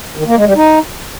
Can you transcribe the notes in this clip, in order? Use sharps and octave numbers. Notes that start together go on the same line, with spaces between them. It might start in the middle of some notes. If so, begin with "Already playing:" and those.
D#3
A#3
G#3
G3
D#4